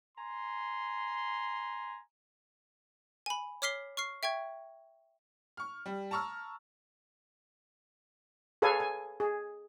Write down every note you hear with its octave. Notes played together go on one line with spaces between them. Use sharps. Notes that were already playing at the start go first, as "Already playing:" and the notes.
G#5 A#5 C6
G#5 B5
C#5 D6 F6 B6 C7 G7
C#6 F6 C7
E5 G5 C#6 G#6
C#6 F6
G3
A5 A#5 C#6 E6 F6
G#4 A4 B4 C#5 F5 G#5
G#5
G#4